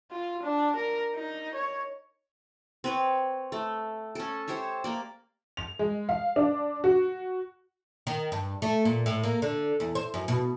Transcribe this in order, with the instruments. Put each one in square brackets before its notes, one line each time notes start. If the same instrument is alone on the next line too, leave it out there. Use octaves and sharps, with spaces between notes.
[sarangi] F4
D4
A#4
D#4
C#5
[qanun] C4 B4 C#5
A3
C#4 A4
G4 C5 C#5 E5
A#3 D5
[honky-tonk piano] F7
G#3
F5
D4
F#4
[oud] D#3
G2
A3
A#2
A2
A#3
D3
E2
C5
F#2
B2